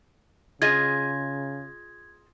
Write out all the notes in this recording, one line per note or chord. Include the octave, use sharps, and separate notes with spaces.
C#3 F4 G#4 D#5 G#6